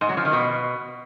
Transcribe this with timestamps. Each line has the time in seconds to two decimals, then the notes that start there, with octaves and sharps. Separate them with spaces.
0.01 G#2
0.09 F#3
0.17 F3
0.25 D#3
0.33 B2